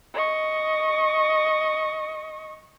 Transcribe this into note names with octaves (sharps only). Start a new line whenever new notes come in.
D#5 C#6